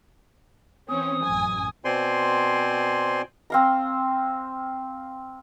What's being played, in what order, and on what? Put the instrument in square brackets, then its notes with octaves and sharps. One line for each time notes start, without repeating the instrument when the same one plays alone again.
[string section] E3 C4 C#4 [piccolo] D#6
[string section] A1 F#2 G#5
[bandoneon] B2 C4 C5 D5 G#5 C6
[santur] C4 F5 A#5